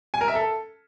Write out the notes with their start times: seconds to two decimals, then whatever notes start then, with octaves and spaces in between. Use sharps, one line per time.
0.14 G#5
0.21 A#4
0.28 E5
0.35 A4